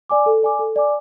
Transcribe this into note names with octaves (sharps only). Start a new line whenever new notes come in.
D5 G#5 D6
A4
D5 G#5 D6
A4
D5 G#5 D6